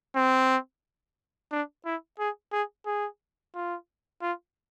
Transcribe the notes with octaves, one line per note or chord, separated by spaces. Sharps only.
C4
D4
E4
G#4
G#4
G#4
F4
F4